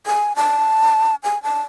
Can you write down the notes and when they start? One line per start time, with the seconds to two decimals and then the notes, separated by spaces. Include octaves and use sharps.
0.07 G#5
0.36 A5
1.24 G#5
1.43 A5